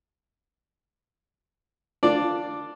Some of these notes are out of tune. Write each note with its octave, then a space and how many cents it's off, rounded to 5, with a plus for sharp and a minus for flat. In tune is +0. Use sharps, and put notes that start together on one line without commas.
D4 +0 F4 +0 D5 +0